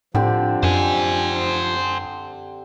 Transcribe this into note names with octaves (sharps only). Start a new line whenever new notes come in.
A2 D3 F3 C4 G4
F#2 C5 G#5